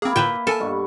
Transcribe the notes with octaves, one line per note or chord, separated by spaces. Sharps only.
A#3 C4 E4 G#4
A2 D3 F4 B4 E5 G5
A4 A#4 G#5 A5
G2 B2 C#6